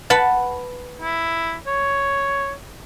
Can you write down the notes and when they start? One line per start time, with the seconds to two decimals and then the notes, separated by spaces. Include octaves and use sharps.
0.10 B4 F#5 A5
1.01 E4
1.67 C#5